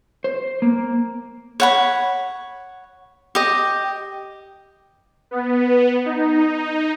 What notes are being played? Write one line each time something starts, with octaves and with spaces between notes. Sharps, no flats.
C5
A#3
C#5 F#5 B5
G4 D#5
B3
D#4